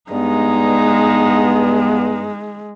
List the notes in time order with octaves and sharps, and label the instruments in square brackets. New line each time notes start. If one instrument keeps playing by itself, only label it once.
[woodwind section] G2 B3 [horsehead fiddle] G#3 [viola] D#4